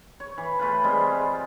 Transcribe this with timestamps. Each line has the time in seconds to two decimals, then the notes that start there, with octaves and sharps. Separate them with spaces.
0.20 C#5
0.38 E3
0.59 A3 F4 B4
0.84 G3 G#3 C4 F4